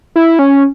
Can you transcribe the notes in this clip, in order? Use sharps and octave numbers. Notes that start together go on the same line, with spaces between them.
E4
C#4